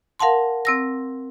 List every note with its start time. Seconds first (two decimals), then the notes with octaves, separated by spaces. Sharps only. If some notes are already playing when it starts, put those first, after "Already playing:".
0.20 A#4 F5 F#5 A5 C6
0.65 C4 E6 A#6